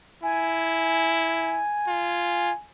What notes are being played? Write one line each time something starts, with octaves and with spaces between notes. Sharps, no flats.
E4 G#5
F4